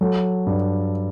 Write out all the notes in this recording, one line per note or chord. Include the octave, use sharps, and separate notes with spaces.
F#3 A4
G2